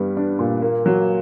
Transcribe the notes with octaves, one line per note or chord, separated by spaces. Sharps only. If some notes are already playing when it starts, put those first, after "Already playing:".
Already playing: G2 G3 B3
D4
A#2
A#3
F#3